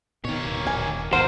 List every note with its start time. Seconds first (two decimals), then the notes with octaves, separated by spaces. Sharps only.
0.25 B2 D#3 A#3 C#5
0.46 D1
0.67 D#1 G#5
1.13 G#1 E2 C3 C4 F4 A#4 C5 F#5